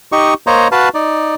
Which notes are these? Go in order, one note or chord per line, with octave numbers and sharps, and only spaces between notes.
D#4 G4 D#5 C#6
A#3 C5 C#5 D#5 A#5
F#4 B4 F5 A5
D#4 D5